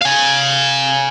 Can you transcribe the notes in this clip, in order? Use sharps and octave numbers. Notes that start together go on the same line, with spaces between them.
F5 G#5